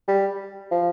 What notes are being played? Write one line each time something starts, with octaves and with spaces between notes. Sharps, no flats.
G3
F3